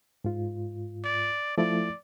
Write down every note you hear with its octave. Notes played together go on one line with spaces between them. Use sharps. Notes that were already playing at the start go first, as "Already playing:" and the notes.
G#2 F4
D5
F3 A3 E4 D5